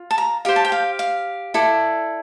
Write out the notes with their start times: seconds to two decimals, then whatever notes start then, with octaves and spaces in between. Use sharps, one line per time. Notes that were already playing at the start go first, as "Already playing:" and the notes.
Already playing: F4
0.11 A5
0.18 A#5
0.45 G4 C5 F5
0.56 A5
0.65 G5
0.72 F5
0.99 F5
1.54 E4 A4 D5